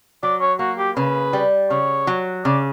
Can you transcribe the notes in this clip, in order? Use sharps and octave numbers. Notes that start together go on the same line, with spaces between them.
F#3 D5
C#5
A#3 F#4
G4
C#3 B4
G3
C#3 C#5
F#3
C#3 D5